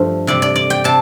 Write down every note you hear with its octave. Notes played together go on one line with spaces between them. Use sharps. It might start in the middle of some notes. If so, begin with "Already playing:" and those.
Already playing: G2 F3 A3
C3 G3 D5
D5
D5
G5
C3 A5